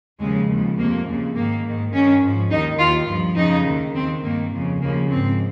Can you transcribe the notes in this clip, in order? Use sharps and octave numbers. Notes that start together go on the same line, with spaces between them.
D#2 C#3 F3 G#3
D#2 C#3 F3
F2 C3 F3 A#3
D#2 C#3 F3
G#2 D#3 A#3
G#2 D#3
G2 D#3 C#4
G#2 F3
D#2 D#3 D#4
D#2 D#3 F4
G2 F3
F2 C#3 F3 D#4
D#2 D#3
D#2 D#3 C4
G2 D#3 A#3
F2 C#3 F3
D#2 C#3 F3 A#3
G#2 F3 C4